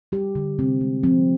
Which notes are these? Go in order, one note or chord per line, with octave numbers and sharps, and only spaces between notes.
G3 G4
D3
C3 C4
G#3
F3 C4